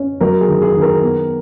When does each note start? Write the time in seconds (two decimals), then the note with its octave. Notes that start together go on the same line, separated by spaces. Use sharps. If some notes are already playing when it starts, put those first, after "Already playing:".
Already playing: C#4
0.21 F#3 A#4
0.41 G#4
0.48 D#3
0.62 G#4
0.75 D#3
0.82 A#4
1.02 B3